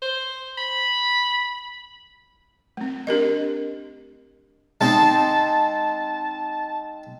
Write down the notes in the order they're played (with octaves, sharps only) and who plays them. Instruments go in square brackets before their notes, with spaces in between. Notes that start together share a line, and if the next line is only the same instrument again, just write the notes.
[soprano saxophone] C5
B5
[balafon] A3 C4
D4 G4 A#4 D#5
[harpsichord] G#3 C4 D#4 [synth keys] A5